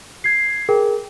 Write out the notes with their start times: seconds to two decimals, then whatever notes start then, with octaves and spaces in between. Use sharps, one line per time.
0.24 G#6 C7
0.69 G#4 A#4 G5